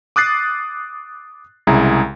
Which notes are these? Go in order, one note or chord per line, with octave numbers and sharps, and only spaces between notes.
D6 D#6 F#6 A6 C7
C2 C#3 G#3 E4 G#4 A#5